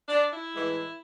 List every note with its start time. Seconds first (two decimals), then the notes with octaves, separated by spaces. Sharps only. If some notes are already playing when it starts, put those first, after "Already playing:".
0.08 D4
0.32 E4
0.54 A2 E3 G#3